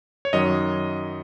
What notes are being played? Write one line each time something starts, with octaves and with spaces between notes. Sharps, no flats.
C#5
F#2 D#3 F#3 D#5